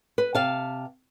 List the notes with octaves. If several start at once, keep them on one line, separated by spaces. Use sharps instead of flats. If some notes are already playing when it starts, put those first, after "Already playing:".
B4
C3 F5 A5